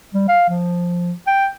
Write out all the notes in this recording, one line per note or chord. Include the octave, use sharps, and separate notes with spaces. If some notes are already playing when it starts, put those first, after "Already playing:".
G3
F5
F3
G5